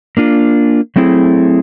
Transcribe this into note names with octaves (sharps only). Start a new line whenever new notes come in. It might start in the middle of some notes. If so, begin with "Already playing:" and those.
A#3 D4 F4
F#3 A3 C4 E4 G#4